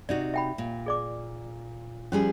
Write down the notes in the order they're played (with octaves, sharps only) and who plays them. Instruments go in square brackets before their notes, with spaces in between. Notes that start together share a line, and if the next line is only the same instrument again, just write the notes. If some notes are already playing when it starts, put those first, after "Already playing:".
[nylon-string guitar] C3 D#4 F#4 [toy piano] D5
[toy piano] E5 G5 B5
[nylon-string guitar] A#2
[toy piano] G#4 D5 D6
[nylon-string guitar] F3 G3 G#4 [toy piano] C#4